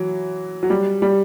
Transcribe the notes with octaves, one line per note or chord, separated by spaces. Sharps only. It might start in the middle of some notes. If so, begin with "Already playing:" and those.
Already playing: E3 F#3
F#3
G3
G3